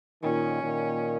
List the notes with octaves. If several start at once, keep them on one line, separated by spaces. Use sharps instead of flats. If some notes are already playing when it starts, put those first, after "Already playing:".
A#2 D#3 C#4
A#2 D#3